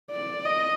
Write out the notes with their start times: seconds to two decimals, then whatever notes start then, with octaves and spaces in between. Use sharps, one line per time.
0.11 D5
0.45 D#5